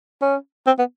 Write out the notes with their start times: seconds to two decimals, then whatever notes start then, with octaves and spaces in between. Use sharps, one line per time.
0.22 C#4
0.67 C4
0.79 B3